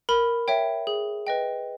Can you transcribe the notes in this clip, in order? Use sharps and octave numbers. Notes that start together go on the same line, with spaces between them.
A#4 B5
C#5 E5 G5
G#4
B4 D#5 G5